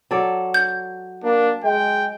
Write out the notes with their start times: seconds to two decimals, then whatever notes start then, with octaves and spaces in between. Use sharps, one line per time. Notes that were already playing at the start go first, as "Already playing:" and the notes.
0.11 F#3 A4 D5
0.54 G6
1.24 A#3 D4
1.64 G#3 G5